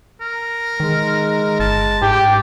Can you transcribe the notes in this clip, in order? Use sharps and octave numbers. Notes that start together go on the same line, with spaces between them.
A#4
D#3 G#3
G1 A5
G#2 G4